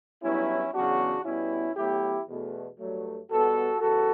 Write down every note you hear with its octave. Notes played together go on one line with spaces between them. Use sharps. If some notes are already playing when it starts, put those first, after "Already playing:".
G2 F#3 B3 C#4 E4
E2 C#3 F#3 B3 D4 F#4
B2 G3 B3 C#4 E4
A2 F#3 B3 E4 G4
E2 B2 A3
G2 F#3 A3
B2 G3 B3 F#4 A4
E2 C#3 F#4 A4